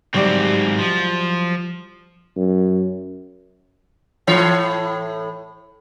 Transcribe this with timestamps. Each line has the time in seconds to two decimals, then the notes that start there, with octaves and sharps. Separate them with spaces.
0.14 G#2 F#3 G3 C4 E4
0.79 F3
2.37 F#2
4.27 A2 E3 C#5